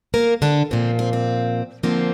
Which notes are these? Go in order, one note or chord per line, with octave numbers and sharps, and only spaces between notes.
A#3 A#4
D3 D4
A#2 F3 A#3 C4
C4
C4
D3 F3 A#3 C4